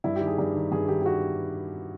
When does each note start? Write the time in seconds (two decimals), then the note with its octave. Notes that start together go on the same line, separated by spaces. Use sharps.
0.04 G2 E4
0.16 D#3 G4
0.27 G#4
0.38 G2
0.55 D#3
0.72 G2 G#4
0.88 D#3 G4
1.01 G4
1.06 F#4